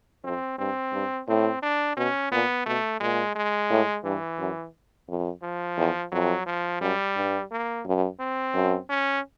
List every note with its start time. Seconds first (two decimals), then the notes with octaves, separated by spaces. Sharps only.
0.24 F2 C4
0.58 G2 C4
0.93 G2
1.28 A2 C4
1.62 D4
1.97 B2 C#4
2.31 A#2 B3
2.66 B2 A3
3.00 A#2 G#3
3.35 G#3
3.70 A2
4.04 G2 E3
4.39 F#2
5.08 F2
5.42 F3
5.77 E2
6.12 F2 F#3
6.46 F3
6.81 F#2 G3
7.16 G2
7.51 A#3
7.86 F#2
8.20 C4
8.54 F#2
8.90 C#4